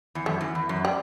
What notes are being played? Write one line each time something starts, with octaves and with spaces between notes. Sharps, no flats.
E2
F#2 A3
E2
E2
F#2
G3